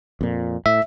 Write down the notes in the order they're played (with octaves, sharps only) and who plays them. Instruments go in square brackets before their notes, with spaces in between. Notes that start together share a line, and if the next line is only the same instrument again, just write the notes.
[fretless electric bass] F2 A#2
[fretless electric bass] A2 [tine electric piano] E5